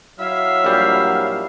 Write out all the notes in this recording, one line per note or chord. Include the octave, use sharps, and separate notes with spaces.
F#3 E4 E5 F5
A#1 G3